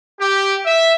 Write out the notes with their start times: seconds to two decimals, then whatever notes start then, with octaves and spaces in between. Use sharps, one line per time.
0.20 G4
0.66 E5